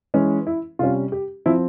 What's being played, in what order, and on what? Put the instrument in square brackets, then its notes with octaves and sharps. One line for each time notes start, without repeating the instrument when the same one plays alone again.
[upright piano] E3 G#3 C#4
E4
C3 G3 C#4 F4
G4
F3 C4 E4